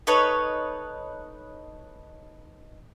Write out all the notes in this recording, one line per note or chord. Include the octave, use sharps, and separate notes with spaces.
D#4 A4 B4 C#5